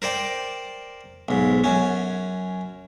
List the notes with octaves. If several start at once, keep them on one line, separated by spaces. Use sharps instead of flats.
A#4 C5 D5 G5
B1 G#2
F#2 C#4